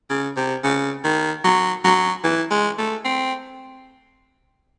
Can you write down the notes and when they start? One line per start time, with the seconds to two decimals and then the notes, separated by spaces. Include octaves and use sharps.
0.10 C#3
0.36 C3
0.63 C#3
1.04 D#3
1.44 F#3
1.84 F#3
2.24 E3
2.51 G#3
2.78 A3
3.05 C4